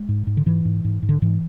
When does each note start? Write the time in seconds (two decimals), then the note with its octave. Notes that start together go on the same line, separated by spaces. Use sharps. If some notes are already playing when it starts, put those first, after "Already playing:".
Already playing: G#3
0.09 G#2
0.27 G#2
0.37 D3
0.46 G#2 E3
0.65 G#2
0.85 G#2
1.03 G#2
1.09 D3
1.22 G#2 E3